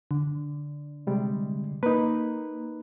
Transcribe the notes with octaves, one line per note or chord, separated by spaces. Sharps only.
D3
C3 G3 G#3
A#3 D#4 B4